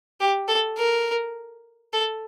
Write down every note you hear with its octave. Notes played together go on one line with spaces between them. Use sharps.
G4
A4
A#4
A4